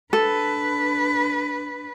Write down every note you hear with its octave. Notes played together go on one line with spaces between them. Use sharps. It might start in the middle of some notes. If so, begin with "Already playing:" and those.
D4 A4 B4